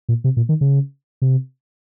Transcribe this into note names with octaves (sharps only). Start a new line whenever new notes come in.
A#2
C3
A#2
D#3
C#3
C3